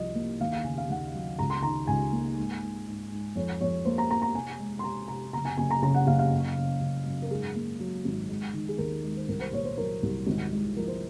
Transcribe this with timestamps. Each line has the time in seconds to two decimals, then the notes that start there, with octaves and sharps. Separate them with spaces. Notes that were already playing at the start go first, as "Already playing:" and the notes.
Already playing: C2 F3 D#5
0.15 A#3
0.41 D#2 F5
0.52 F5
0.64 C#3 G#5
0.78 F5
0.90 D#2 F#5
1.15 F#3
1.39 C#2 A#5
1.50 C6
1.63 D#3 A#5
1.87 C#2 G#5
2.12 A#3
2.37 G#2
2.62 G#2
2.87 G#2
3.12 G#2
3.35 F2 C#5
3.61 F2 C#5
3.85 A#3 C5
3.98 A#5
4.10 A#3 A#5
4.22 A#5
4.34 C3 G#5
4.59 G#3
4.79 C6
4.84 C3 A#5
5.08 C3 A#5
5.33 F#1 A#5
5.45 G#5
5.57 F#1 G#5
5.71 A#5
5.82 C#3 A#5
5.94 F#5
6.07 F#1 F5
6.19 F5
6.31 F#2
6.57 C#3
6.81 C#3
7.07 F#2
7.22 A#4
7.30 G#2 G#4
7.56 A#3
7.80 F#3
8.05 G#1
8.29 G#3
8.54 D#3
8.69 G#4
8.78 D#2 A#4
9.03 G#3
9.17 C5
9.28 C2 A#4
9.41 C5
9.52 A#2 C#5
9.65 C5
9.78 F#3 A#4
10.02 C2
10.27 G#1
10.52 G#3
10.76 F3 A#4
10.88 C5